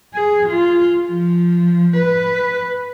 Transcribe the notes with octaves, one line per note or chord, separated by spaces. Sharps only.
G#4
F4
F3
B4